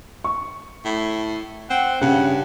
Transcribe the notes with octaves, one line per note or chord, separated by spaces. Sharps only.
C#6
A2
C4 F#5
G2 C#3 F#5